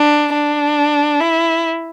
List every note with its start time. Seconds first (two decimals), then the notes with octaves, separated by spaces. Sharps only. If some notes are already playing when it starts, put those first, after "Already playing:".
Already playing: D4
0.34 D4
1.20 E4